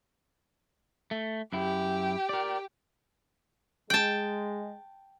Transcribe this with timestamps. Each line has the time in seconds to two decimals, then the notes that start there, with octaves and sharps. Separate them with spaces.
1.11 A3
1.53 F#2 E4 G4
2.29 A#4 D5
3.90 G#3 G5 A5